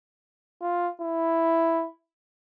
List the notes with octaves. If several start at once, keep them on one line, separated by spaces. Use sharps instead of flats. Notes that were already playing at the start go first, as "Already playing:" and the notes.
F4
E4